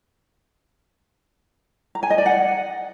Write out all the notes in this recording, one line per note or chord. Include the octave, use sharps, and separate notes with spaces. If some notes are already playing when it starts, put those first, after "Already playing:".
A#5
G#5
D#5
D5
F#5